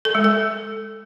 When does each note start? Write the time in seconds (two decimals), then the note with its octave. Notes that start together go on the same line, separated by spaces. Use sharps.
0.05 A4
0.15 G#3
0.24 A4